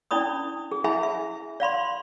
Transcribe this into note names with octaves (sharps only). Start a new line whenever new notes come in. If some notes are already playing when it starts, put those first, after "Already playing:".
C#4 D4 E4 D5 B5 D#6
G#4
E4 G#4 E5 G#5 B5
E5
D5 F5 B5 C6